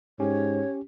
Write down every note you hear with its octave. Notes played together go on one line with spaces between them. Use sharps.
G#2 C#4 G4 C#5